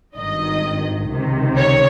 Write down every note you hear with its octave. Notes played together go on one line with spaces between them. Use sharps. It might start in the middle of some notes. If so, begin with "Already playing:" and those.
G#1 G2 D#3 D#5
C#2 C3 D#3
C#5